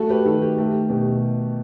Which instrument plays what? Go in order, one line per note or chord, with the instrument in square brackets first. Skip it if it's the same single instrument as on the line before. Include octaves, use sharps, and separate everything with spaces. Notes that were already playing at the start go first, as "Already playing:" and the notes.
Already playing: [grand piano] A3 F#4 A4
G4 B4
D#3 F#4 A4
G4
A3 G4
B2 G4